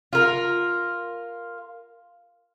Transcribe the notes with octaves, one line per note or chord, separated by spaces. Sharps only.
F4 A#4